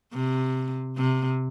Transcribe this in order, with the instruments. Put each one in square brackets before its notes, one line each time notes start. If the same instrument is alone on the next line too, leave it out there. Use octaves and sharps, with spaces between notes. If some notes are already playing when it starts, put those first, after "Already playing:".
[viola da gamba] C3
C3